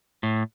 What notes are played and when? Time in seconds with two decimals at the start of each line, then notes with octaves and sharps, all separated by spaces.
0.23 A2